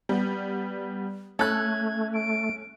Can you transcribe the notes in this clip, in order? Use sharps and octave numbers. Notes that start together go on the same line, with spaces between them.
G3 B3
A3 C#4 A4 F#6 G#6
D7